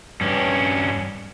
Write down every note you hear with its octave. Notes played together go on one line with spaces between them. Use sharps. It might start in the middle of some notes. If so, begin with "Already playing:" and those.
G2 C#4